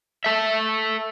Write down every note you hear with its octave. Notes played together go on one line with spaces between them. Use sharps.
A4 E5